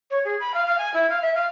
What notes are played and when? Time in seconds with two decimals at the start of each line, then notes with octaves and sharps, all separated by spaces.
0.10 C#5
0.24 G#4
0.39 B5
0.54 F5
0.66 F5
0.78 G#5
0.93 E4
1.09 F5
1.22 E5
1.34 F5